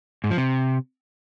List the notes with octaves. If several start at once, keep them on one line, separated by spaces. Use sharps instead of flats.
G#2
F3
C3